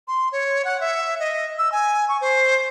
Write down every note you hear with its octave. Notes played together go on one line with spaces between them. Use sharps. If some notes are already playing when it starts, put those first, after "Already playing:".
C6
C#5
F#5
E5
D#5
E6
G#5
C#6
C5